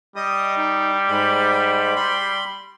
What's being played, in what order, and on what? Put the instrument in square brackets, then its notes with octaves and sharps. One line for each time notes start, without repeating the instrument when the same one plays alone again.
[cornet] G3 [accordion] D#5 D#6
[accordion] D#4
G#2 G#3 B5
B5 C6